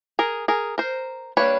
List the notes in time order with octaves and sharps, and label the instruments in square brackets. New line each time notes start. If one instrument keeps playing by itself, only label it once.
[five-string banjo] G#4 A#4
G#4 A#4
A#4 C5
G3 A#3 D4 B4 C#5